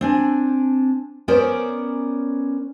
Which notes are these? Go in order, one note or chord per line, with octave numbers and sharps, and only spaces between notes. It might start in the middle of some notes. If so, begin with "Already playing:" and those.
C4 D4 G#5
B3 C#4 A#4 C5 D5